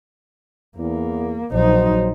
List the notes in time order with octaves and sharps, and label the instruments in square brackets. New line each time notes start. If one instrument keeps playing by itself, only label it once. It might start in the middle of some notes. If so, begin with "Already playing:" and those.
[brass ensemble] E2 [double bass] A#3
[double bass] A#1 D#4 [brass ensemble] F#3 C5